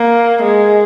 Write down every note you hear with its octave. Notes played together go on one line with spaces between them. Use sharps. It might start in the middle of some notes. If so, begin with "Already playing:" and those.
Already playing: A#3
G#3